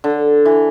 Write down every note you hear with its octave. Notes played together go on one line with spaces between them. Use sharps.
D3
E3